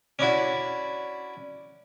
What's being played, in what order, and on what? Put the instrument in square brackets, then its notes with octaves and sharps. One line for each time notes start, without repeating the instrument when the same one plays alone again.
[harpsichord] C#4 D4 E4 F#4